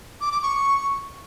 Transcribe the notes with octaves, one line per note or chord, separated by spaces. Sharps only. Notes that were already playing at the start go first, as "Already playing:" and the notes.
D6
D6
C#6